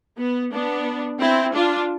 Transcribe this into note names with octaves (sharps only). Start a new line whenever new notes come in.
B3
B3 D4
C4 E4
D4 F4